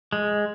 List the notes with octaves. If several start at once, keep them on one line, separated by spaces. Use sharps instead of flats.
G#3